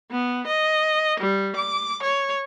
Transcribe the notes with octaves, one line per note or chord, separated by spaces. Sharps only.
B3
D#5
G3
D6
C#5